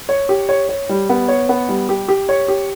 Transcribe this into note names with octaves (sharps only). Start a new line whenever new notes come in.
C#5
G4
C#5
C#5
G3
B3
C#5
B3
G3
G4
G4
C#5
G4